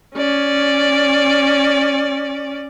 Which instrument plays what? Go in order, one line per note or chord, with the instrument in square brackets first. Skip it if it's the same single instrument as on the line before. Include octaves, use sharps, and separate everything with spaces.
[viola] C#4 D5